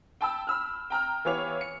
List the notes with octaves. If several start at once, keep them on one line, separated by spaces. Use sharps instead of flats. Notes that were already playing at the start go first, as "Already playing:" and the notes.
G5 A5 B5 E6
B5 E6 F6
G5 A#5 F6
E3 B3 G4 C#5 F5 F7
C#7